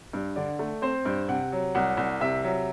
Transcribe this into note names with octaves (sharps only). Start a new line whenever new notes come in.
G2
D3 D5
A3
C4 C5
G2
C3 F#5
F#3
C2 F#5
C2
C3 E5
F#3